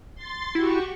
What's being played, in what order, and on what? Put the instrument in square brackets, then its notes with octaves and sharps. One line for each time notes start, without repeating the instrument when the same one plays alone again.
[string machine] C6 A6
[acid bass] E4 [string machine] F#4 G4 C#6